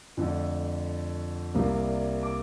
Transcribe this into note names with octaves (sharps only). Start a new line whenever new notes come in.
F2 D3 A3
C2 C3 G3 A#3
D6